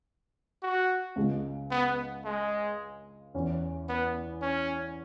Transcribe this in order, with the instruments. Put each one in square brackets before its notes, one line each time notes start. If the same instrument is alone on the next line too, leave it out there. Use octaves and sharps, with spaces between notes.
[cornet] F#4
[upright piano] C#2 C#3 G#3
[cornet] B3
G#3
[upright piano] E2 E3 C#4
[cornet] B3
C#4